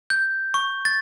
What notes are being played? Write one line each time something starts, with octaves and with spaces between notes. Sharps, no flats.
G6
C#6
A6